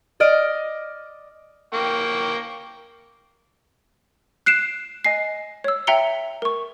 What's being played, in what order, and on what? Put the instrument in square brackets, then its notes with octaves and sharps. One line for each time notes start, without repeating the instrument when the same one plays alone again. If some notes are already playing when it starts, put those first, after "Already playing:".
[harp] D5 D#5 F6 D7
[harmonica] A#3 G5 C#6
[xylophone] F#6 C7 D7 E7
D#5 G#5 C7
C#5 E6
E5 G5 A#5 C#7 G7
A#4 C#6